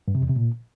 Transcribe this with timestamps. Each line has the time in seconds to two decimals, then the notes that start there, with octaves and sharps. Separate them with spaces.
0.08 G2
0.15 C3
0.22 E2
0.29 C3
0.36 A#2